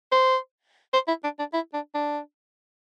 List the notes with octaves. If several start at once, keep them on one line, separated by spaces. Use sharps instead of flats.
C5
C5
E4
D4
D4
E4
D4
D4